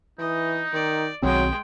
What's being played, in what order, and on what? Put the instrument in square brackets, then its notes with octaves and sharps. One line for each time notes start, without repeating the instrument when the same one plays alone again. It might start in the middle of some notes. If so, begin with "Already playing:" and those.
[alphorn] E3 [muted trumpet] D#4 [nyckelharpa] D#5
[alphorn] D#3 [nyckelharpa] D5
[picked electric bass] B1 D#3 C4 [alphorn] F#3 [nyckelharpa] G#3 G5